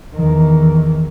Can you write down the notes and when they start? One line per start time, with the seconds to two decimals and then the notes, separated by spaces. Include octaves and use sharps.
0.16 E2 D#3